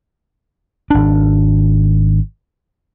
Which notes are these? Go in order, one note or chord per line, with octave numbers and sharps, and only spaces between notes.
G#1 D4